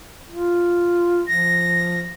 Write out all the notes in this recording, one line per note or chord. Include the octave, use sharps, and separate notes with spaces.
F4
F3 A#6